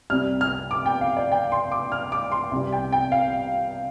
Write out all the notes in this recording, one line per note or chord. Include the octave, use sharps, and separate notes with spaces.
C2 C3 G3 F6
F6
D6
G5
F5
D5
G5
C6
D6
F6
D6
C6
C2 C3 G3
G5
G5
F5